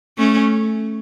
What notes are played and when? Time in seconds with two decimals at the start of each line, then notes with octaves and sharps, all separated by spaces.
0.18 A3 C#4